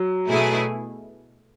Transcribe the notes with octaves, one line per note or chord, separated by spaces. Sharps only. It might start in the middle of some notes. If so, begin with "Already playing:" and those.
Already playing: F#3
B2 A3 E4 G#4